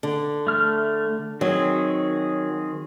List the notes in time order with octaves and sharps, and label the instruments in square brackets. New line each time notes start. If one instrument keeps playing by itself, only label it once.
[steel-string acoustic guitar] D3
[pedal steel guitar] A3 F6
[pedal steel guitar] D#3 C4 G#4 [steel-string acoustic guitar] F#3